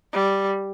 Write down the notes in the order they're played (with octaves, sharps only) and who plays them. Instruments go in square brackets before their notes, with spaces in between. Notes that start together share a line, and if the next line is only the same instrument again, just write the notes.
[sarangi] G3